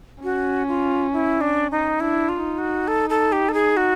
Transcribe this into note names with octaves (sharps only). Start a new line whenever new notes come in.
C#4 F#4
F4
E4
D4
D#4
D4 E4
F4
D#4
F#4
A4
A4
G4
A4
G#4
F#4